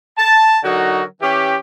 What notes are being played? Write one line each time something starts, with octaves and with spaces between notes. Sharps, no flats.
A5
D3 F#3 D#4 F#4 A#4
E3 C#4 G4